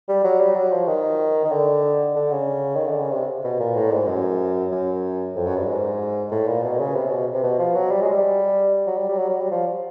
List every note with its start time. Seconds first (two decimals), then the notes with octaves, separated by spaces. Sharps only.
0.09 G3
0.24 F#3
0.40 G3
0.56 F#3
0.72 F3
0.88 D#3
1.45 D#3
1.52 D3
2.16 D3
2.32 C#3
2.76 D#3
2.88 D3
3.00 C#3
3.12 C3
3.44 B2
3.60 A#2
3.76 A2
3.91 G#2
4.08 F#2
4.72 F#2
5.36 F2
5.47 F#2
5.57 G2
5.67 G#2
6.31 A2
6.48 A#2
6.63 B2
6.79 C#3
6.95 C3
7.11 B2
7.34 C3
7.44 B2
7.59 F3
7.75 F#3
7.91 G3
8.02 G#3
8.12 G3
8.87 F#3
8.97 G3
9.09 G3
9.18 F#3
9.29 F#3
9.41 G3
9.51 F3